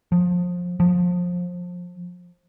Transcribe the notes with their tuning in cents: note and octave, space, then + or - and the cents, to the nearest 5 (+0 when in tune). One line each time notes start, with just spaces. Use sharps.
F3 +25
F3 +25